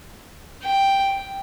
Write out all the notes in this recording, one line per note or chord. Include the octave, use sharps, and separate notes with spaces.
G5